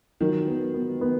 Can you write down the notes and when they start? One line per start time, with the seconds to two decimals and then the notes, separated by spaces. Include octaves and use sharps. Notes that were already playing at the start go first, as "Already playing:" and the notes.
0.21 D#3 F#3
0.47 B3
0.74 B3
1.01 B3